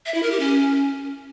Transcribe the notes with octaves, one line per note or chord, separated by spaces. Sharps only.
E5
E4
A#4
G4
C#4